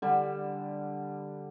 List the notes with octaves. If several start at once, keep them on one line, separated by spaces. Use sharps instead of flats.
D3 G3